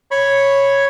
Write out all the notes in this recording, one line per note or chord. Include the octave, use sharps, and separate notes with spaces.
C#5 B5 C#6